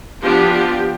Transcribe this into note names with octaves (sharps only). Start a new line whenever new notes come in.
F3 B3 D4 G4
G4